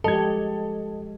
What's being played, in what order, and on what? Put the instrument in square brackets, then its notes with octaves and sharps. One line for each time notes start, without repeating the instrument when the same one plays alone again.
[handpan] F3 G#3 G4 [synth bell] A4 [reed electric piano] D#5 G#6 [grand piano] A5